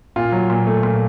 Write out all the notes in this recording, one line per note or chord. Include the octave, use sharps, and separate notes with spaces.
A#2 F4
F#3
A#2
A3
A#2